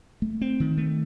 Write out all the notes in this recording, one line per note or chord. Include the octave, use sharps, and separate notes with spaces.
A3
C4
D#3
A3